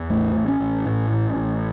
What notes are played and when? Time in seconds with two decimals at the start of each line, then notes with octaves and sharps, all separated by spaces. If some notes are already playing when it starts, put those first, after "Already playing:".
Already playing: E2
0.10 A1 A3
0.36 A1
0.48 C#4
0.60 A1
0.85 A2
1.11 A1
1.36 A1